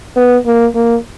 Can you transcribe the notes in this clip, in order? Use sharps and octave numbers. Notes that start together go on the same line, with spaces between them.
B3
A#3
A#3